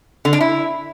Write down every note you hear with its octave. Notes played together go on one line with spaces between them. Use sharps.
D3
D4
E4